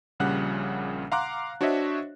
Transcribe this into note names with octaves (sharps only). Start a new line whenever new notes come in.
A#1 A#2 C#3 G3 F#5 F#6
F5 F#5 A#5 C6 D6 F#6
D4 F#4 C5 C#5 D#5 E5